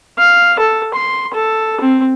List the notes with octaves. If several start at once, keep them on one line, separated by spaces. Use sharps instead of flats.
F5
A4
C6
A4
C4